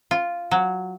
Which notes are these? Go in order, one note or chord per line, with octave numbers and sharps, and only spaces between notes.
F4
F#3